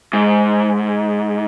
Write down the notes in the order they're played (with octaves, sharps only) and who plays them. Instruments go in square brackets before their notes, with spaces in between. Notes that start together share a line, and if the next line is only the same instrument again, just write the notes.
[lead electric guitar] G#2